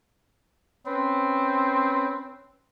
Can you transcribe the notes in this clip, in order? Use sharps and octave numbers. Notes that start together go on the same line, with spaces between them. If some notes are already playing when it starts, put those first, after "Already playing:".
C4 C#4 B4